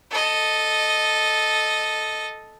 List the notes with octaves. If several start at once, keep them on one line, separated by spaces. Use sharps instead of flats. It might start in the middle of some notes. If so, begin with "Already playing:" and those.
A4 D#5